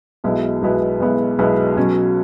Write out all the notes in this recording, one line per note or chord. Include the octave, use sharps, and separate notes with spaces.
B1 B2 G#3 B3 E4
B1 B2 G#3 B3 E4
B1 B2 G#3 B3 E4
B1 B2 G#3 B3 E4
B1 B2 F#3 C#4